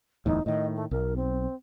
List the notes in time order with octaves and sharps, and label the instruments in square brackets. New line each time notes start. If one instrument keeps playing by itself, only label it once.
[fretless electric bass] D1 E2 A2 [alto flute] D#4
[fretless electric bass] A2 D#3 [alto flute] D#5
[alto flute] A3
[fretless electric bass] B1 [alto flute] A#4
[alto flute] C4